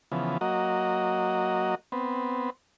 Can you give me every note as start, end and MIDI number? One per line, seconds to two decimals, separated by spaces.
0.12 0.38 49
0.12 0.38 52
0.12 0.38 53
0.12 0.38 59
0.41 1.75 54
0.41 1.75 58
0.41 1.75 66
0.41 1.75 75
1.92 2.50 59
1.92 2.50 60